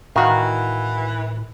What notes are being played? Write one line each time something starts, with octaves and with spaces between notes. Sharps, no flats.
A2 D#3 E3 F#4 F5